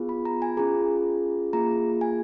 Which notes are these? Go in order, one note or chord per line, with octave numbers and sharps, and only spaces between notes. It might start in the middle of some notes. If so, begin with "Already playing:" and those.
Already playing: B3 F4 G#4
B5
A#5
G#5
C#4 F4 G#4 A#5
A#3 F4 G#4 A#5
G#5